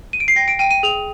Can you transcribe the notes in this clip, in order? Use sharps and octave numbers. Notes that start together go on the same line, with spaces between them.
D#7
D7
C7
G5 A#6
D7
G5 D#7
D#7
G#4 F7